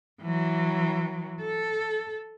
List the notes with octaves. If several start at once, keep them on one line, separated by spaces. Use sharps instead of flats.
E3 F#3
A4